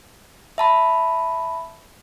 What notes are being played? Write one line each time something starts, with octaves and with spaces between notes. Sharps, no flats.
E5 A5 B5